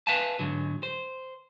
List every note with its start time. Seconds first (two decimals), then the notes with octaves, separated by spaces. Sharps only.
0.07 B4 E5 F5 G#5 A5
0.39 G#2 D3 F#3
0.83 C5